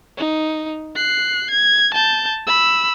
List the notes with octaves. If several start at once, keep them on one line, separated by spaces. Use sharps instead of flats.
D#4
F#6 C7
G#6
A5 G6
B5 E6